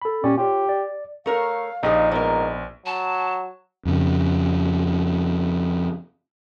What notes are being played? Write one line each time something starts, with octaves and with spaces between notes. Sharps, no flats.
A4 B5
A#2 C#4 G4 D5
F4 G4 C#5
D5
A3 A#4 C#5 F5
A#1 A#2 D#4 G4 G#4
G#2 A#3 B3 F4 A#4
F#3 A5
F2 C#3